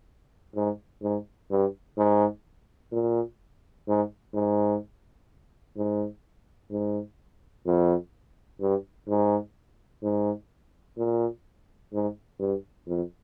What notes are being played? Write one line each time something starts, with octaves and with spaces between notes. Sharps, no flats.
G#2
G#2
G2
G#2
A#2
G#2
G#2
G#2
G#2
F2
G2
G#2
G#2
A#2
G#2
G2
F2